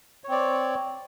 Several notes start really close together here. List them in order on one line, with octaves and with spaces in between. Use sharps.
C#5 C4 D5